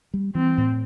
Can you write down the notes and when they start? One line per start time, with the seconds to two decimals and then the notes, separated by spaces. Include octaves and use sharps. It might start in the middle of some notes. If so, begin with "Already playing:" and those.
0.14 G3
0.35 E3 C4
0.58 A2